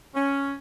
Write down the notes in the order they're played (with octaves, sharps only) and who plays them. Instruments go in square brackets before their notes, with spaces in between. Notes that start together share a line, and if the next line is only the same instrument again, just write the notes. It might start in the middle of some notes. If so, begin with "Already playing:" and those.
[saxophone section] C#4